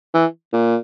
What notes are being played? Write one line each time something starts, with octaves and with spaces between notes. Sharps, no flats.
E3
A#2